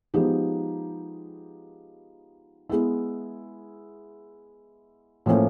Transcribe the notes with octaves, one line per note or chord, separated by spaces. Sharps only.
F3 G#3 B3 D#4 G4
G#3 B3 E4
A2 F3 A#3 C#4